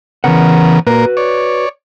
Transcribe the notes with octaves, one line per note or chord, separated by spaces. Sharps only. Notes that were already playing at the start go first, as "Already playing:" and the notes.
C#3 E3 B3 A#4 F#5
A#2 A#3 F#4 A#4 B4
C#5 D5